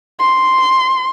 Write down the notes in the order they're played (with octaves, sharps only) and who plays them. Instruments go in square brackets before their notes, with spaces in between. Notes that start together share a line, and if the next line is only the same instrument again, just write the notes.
[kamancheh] C6